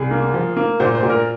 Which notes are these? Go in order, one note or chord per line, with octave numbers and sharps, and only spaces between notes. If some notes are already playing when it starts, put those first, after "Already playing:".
Already playing: C2 G#4
A#3
F3
A#3
A#2 C5
C5
A#2
A#4